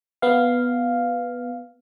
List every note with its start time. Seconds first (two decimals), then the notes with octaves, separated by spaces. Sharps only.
0.22 B3 F5